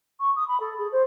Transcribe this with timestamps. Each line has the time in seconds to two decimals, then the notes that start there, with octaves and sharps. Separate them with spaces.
0.20 C#6
0.36 D#6
0.48 B5
0.60 A4
0.78 G#4
0.92 C5